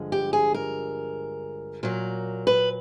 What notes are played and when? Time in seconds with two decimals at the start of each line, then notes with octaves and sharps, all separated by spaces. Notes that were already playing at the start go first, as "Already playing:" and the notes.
Already playing: G2 D3 F3 G#3
0.12 G4
0.33 G#4
0.54 A#4
1.83 A#2 F#3 A#4
2.47 B4